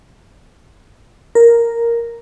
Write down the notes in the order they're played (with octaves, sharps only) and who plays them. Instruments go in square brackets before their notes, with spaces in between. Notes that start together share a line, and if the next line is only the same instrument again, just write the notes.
[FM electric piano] A#4